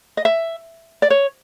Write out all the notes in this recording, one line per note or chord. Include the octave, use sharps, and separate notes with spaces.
D#5
E5
D5
C#5